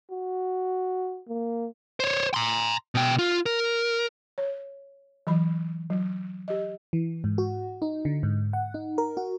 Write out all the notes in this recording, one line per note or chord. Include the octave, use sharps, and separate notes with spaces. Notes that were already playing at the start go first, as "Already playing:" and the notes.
F#4
A#3
C5 C#5
A#5 C6
B2 G5
F4
A#4
C#5
E3 F#3 B5
F#3
G4 D#5
E3
G#2
F#4
D#4
D3
G#2
F#5
D#4
A#4
F#4